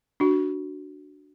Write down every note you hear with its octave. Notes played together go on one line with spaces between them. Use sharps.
D4 F#4